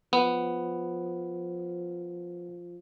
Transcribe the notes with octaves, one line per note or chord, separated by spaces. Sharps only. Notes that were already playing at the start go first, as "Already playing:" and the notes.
F3 B3